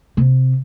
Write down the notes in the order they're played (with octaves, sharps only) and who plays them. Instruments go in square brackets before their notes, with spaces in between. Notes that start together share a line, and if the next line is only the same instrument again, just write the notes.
[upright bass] C3